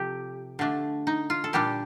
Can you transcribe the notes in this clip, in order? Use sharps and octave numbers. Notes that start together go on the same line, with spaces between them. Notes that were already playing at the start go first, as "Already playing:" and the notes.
Already playing: C3 F3 G4 A4
D3 A3 D4
D#4
F4
A4
A#2 G3 D4 G4